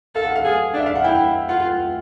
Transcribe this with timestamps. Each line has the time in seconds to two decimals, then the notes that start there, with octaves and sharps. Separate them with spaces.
0.15 A4 F5
0.25 F#5
0.36 F5
0.45 G#4
0.74 D4 E5
0.86 F5
0.95 F#5
1.04 E4 G5
1.49 F4 F#5